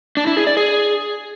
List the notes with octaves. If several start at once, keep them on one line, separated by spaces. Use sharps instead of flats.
D4
E4
G#4
D5
G#4